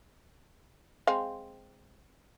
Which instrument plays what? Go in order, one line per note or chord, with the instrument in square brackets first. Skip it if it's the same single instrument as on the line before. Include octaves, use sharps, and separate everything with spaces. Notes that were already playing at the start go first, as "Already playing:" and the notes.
[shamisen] G#3 C4 F5